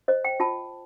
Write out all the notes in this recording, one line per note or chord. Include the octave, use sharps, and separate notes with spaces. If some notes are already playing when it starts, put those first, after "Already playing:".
C5 D#5
G5
F4 A5